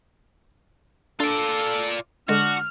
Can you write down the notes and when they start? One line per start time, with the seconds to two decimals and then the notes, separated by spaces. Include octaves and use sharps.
1.20 D4 F4 A4 D5
2.29 D3 G#3 D4 F#4 F6